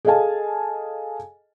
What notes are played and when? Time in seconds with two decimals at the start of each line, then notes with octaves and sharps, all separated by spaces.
0.05 G#4 A4 D#5 F5 G#5 A5